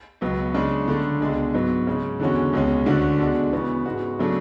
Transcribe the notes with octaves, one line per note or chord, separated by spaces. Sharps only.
C#2 B2 F#3 B3
C#3 G#3 D4
D3 A3 D4
C#2 B2 G#3 D4
G#2 F#3 B3
C#3 G#3 C#4
E2 D3 G#3 C#4 F#4
C#2 B2 G#3 C#4
D2 D3 A3 D4 F#4
B2 G#3 D4 F#4
C#3 E3 B3 F#4
G#2 G#3 B3 F#4
C#3 F#3 A3 D4